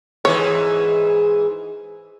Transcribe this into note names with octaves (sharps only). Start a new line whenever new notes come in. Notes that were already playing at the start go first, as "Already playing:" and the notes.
G#2 E3 C#5